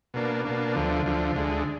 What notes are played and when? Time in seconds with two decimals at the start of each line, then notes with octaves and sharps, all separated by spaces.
0.14 B2 A#3 D4
0.45 B2 A#3 D4
0.75 D2 D3 F3
1.06 D2 D3 F3
1.36 D2 D3 G#3